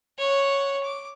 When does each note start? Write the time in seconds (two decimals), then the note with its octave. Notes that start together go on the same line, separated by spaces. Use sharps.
0.18 C#5 F#5
0.84 D6